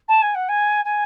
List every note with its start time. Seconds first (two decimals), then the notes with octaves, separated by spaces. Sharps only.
0.08 A5
0.21 G#5
0.34 F#5
0.48 G#5
0.84 G#5